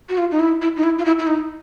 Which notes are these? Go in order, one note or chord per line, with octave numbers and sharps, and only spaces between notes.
F#4
F4
D#4
E4
E4
D#4
E4
F4
E4
E4
D#4